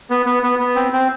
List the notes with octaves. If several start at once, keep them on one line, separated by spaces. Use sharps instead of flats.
B3
B3
B3
B3
C4
C4